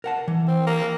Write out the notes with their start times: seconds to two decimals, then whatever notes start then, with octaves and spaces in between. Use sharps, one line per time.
0.04 A#4 F#5 A5
0.28 E3
0.48 C4
0.67 A#3